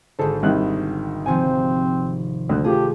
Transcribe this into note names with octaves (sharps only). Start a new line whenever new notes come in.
G#1 D3 G#4 A4 C5
C2 D#3 F#6
C3 D#3 F3 C4 G#5
D2 F#6
F3 A3 F4 G4 G#4